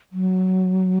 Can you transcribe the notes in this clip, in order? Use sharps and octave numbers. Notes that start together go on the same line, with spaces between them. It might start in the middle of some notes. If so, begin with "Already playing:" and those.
F#3